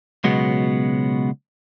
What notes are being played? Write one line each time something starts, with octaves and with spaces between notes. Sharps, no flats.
C#2 B2 F#3 G#3 B3